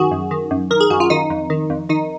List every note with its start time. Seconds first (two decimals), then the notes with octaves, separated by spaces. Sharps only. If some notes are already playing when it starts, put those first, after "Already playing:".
Already playing: F#2 D#3 F#4 G#4
0.11 F#2
0.31 D#3
0.51 F#2
0.71 D#3 A#4
0.80 G#4
0.90 F#2 F#4
1.00 F4
1.10 D#3 D#4
1.30 F2
1.50 D#3
1.70 F2
1.89 D#3 D#4